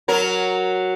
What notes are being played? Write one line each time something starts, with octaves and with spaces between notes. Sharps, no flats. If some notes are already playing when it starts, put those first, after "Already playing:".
F#3 A#4